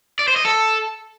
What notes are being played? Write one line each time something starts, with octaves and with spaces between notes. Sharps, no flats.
D5
C5
D#5
A4